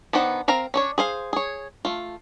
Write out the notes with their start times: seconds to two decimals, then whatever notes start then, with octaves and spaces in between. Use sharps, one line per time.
0.13 D#3 B3 D4 C5 F#5
0.48 C4 A#4 F5 A#5
0.74 C#4 D4 C#5
0.98 G#4 C5 F5
1.33 G#4 C#5
1.85 A3 F4